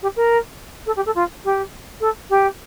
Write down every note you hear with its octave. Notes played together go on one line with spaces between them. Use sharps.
G4
A#4
A4
G4
A4
F4
G4
A4
G4